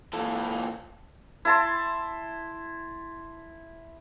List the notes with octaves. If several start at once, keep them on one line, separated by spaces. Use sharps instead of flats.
A#2 E3 A4
E4 A5 C6